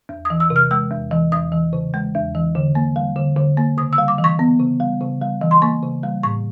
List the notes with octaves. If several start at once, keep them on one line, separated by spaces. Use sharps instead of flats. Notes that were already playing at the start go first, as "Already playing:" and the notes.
E2
D#6
E3
E6
C3
F6
G#3 E6
E2
E3
E2 D#6
E3
C#3
G#3
E2
E3
D3
A#3
G3
D3
D3
A#3
C#3 D#6
E6
G3
D6
E3
C#6
B3
C#3
G3
C#3
G3
E3
C6
A#3 C#6
C#3
G3
A2 C#6